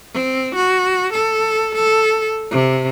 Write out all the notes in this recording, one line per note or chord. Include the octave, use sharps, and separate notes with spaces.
C4
F#4
A4
A4
C3